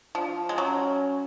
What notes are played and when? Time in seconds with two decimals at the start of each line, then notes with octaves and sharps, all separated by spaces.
0.15 F3 D4
0.49 G#3
0.58 F#3 C#4